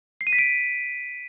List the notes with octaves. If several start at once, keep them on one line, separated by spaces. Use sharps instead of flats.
C7
D#7
B6
D7